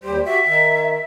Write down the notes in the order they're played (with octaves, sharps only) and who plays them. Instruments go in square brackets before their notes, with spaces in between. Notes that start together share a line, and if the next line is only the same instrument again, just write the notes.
[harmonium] D#2 G3 C5 [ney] G4
[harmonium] F#4 G4 [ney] E5
[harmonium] D#3